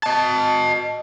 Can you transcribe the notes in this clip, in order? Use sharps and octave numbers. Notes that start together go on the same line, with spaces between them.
D#5 A5